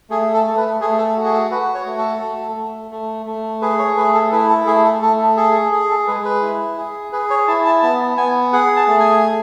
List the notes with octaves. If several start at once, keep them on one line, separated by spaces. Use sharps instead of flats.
A3 G#4
A4
A3
B4
A3 G#4
A4
F#4
G#4
A4
F#4 B4
C#5
A3
A4
A3
A3
A3
A3
G#4 B4
C#5
A3 B4
A4
E4 B4
A4
A3 G#4
A4
A3 A4
G#4 A4
G#4
A4
G#3 B4
B4
E4
G#4
G#4 B4
C#5
E4 A5
A5
B3 A5
B3 G#5
G#4 F#5
A5
A3
G#5
G#4